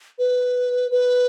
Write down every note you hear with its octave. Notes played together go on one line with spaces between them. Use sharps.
B4
B4